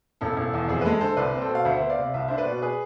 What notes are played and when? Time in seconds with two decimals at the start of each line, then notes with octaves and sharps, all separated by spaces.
0.21 E1 A4
0.37 E1
0.54 E2
0.69 F2 G#4
0.81 B4
0.85 G#3 A4
1.01 D3 A4 C5
1.17 C2 B4 D5
1.34 C4
1.41 A4 C5
1.49 B2
1.55 F5
1.65 D2 C5 E5
1.81 B3
1.89 D5 F5
1.98 C3
2.14 C2 E5
2.21 F5
2.28 D4 C5 E5
2.38 B4 D5
2.46 B2
2.62 G#4 B4